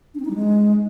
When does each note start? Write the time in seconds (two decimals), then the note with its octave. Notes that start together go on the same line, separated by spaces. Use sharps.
0.14 D4
0.20 C4
0.25 D#4
0.30 G3
0.36 G#3